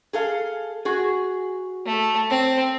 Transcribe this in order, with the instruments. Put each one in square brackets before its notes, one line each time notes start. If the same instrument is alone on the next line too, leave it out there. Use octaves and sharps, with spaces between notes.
[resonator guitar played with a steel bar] G#4 A4 F5
F#4 G#4
[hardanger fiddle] A3
C4